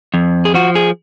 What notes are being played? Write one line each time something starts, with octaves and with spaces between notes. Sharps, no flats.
F2
G#4
F3 F#4
G#4